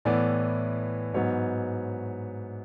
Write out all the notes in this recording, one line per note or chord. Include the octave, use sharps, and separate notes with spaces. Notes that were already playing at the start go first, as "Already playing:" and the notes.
A2 E3 B3 D5
G#2 F#3 B3 C#5